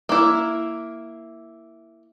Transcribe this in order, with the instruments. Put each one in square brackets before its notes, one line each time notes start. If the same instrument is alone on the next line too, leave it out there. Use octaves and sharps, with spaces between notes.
[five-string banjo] A#3 E4